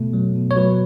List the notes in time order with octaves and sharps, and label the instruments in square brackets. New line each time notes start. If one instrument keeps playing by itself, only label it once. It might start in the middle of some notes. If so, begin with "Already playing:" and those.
Already playing: [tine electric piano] B2 A3
F#3
B2
C#5
F#3 B4